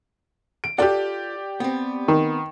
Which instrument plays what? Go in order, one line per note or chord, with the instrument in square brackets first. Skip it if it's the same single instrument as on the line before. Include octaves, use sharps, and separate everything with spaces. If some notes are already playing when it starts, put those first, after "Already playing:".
[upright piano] D7
[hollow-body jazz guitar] F4 A4 F#5 [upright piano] G4 D5
[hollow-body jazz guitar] B3 C4
[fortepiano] D#3